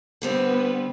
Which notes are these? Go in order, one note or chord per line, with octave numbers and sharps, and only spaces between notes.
D3 G3 B3 C4 B4